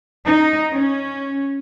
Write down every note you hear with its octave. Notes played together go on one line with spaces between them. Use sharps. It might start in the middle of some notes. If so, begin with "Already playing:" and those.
D#4
C#4